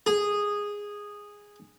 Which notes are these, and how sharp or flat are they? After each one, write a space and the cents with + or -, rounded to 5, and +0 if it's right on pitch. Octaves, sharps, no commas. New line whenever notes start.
G#4 -10